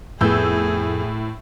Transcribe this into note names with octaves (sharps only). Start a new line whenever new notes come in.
F2 A2 B3 G#4 E6 G6